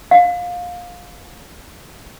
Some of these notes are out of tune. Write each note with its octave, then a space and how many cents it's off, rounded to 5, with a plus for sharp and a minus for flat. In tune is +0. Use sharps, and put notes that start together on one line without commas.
F5 +20